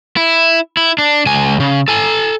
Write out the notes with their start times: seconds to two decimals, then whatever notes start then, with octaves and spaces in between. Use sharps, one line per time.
0.17 E4
0.77 E4
0.98 D4
1.26 C#2 G#5
1.60 C#3
1.88 A4 G#5